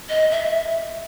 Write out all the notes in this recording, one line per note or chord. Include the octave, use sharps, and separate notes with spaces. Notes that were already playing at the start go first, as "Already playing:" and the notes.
D#5
E5